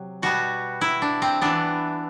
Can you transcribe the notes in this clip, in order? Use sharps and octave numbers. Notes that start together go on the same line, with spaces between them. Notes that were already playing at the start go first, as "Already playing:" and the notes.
Already playing: C3 F#3
B2 G3 B3 F#4
E4
D4
C4
E3 B3 D4